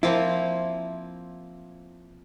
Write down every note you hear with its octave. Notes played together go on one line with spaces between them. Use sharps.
F3 A#3 C4 E4